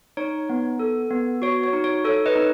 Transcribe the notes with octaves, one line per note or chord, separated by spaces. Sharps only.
D#4 C#5
B3
A4
B3
F#4 C#5
C#5
D#4
C#5
A4 C#5
B4 D#5
D#4